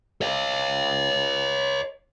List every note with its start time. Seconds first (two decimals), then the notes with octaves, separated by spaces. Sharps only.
0.21 C#5 D#5